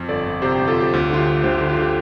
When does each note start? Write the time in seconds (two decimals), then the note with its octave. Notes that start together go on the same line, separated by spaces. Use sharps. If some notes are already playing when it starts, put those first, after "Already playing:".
Already playing: F2
0.09 G1 A4 D5
0.26 G1
0.42 C3 G4 C5
0.55 G4
0.59 G1
0.67 F4 A4
0.76 G1 G4
0.93 D2 F4
1.10 D3 F4
1.19 G4
1.26 D2
1.43 D2 G4 C5
1.56 G4
1.61 D3
1.69 F4
1.77 D3
1.82 G4